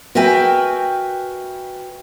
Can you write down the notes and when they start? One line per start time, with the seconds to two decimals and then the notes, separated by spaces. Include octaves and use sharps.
0.15 F#4 A#4 B4 E5 G5 G#5